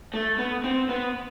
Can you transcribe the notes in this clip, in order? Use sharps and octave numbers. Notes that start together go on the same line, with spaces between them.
A3
B3
C4
B3